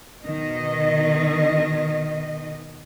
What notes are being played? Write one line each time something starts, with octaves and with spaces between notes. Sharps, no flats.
B2 D#3 D#5